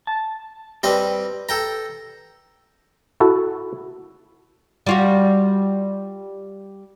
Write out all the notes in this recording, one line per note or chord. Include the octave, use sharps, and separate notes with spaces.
A5
G3 C4 G4 B4 D#5
A4 G5 A#5
E4 F#4 A4
G3 F4 F#4